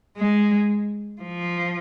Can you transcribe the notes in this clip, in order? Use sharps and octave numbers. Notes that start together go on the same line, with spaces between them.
G#3
F3